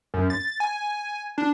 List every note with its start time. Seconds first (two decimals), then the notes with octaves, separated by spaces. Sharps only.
0.14 F#2
0.30 A6
0.60 G#5
1.38 D4